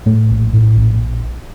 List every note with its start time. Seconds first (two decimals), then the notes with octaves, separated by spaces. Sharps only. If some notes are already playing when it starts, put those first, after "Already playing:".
0.06 A2 A3
0.30 A#1
0.53 A2
0.77 A#1